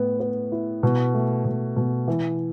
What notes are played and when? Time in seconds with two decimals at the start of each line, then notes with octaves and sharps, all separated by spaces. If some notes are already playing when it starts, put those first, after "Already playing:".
Already playing: A2 B3
0.20 B3
0.52 E4
0.83 B2
1.14 A3
1.45 B2
1.76 B2
2.08 E3